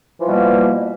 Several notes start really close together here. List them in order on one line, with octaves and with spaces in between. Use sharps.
E3 F3 G3 B2 A#3